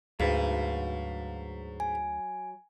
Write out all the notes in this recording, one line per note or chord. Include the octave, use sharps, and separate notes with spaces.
D2 G#2 F#3 B4 F5
G#5